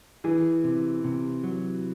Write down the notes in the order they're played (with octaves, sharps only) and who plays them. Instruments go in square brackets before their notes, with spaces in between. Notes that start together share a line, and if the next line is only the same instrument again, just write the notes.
[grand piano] E3 [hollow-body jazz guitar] G#4
[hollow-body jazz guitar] C3
C3
F#3